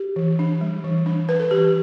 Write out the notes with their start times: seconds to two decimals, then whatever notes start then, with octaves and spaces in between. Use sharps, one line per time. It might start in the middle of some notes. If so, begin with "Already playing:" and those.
Already playing: G4
0.16 E3
0.39 D4
0.61 G3
0.84 E3
1.06 D4
1.29 D4 B4
1.40 A4
1.51 E3 G4